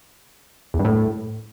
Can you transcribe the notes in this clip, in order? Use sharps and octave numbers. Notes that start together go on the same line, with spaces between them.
E2
G2
A2